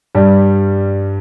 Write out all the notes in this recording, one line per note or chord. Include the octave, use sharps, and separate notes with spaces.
G2 G3